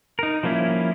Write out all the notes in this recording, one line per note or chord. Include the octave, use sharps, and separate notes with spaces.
D#4 A#4
F3 G3 A#3 C#4 E4